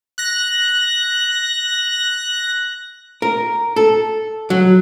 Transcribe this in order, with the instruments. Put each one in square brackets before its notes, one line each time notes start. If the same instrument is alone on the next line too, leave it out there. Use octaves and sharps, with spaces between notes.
[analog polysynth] F#6 A#6
[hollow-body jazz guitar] A#4
A4
F#3